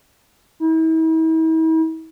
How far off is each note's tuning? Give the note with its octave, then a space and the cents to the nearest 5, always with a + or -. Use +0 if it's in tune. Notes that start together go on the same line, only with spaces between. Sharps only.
E4 -45